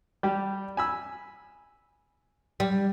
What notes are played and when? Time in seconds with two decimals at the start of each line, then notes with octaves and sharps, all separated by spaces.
0.23 G3 G4
0.77 G#5 B5 E6
2.60 G3